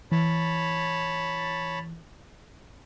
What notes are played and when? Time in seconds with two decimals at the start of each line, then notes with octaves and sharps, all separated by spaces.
0.12 E3 C#5 A5 B5